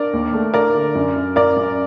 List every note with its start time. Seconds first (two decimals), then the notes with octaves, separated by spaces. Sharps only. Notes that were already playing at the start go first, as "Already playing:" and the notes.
Already playing: D4 A#4 D5
0.13 D#2
0.34 A3
0.54 D4 A#4 D5
0.75 D3
0.95 F#2
1.16 F#2
1.36 F#2 A#4 D5
1.56 F#2